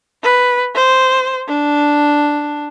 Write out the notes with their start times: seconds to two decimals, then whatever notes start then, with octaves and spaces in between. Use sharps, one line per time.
0.23 B4
0.75 C5
1.48 D4